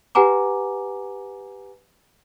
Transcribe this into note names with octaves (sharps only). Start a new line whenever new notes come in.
G4 B4 F#5 G#5 A#5 D6